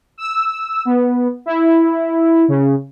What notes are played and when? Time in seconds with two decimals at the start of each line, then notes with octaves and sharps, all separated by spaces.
0.18 E6
0.85 B3
1.46 E4
2.48 C#3